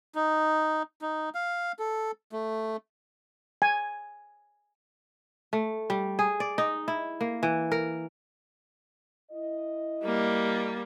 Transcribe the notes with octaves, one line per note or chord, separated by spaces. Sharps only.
D#4
D#4
F5
A4
A3
G#5
A3
G3
G#4
D5
D#4
E4
A#3
E3
A#4
E4 D#5
G3 A#3